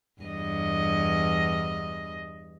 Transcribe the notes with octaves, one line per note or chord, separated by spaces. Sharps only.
E2 G2 D#5